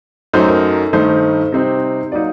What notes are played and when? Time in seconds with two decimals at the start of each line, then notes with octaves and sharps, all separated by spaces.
0.33 F#2 F#3 A3 D#4 C5
0.48 A#4
0.93 G2 D#3 A3 D#4 C5
1.52 C3 G3 C4 D#4
2.12 F#3 A#3 D#4 D5